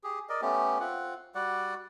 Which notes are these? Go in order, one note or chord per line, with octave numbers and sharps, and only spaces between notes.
G4 G#4
A#4 D5 D#5
A3 B3 C#4 G4
C4 F4 F#5
G3 F#4 D5 F#5